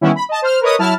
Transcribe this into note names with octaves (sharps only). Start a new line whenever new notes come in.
D#3 E3 G3 B3 C#4 E4
B5
D#5 A5
C5 F6
A#4 B4 C#5 D#5 D#6
F#3 E4 A5 F6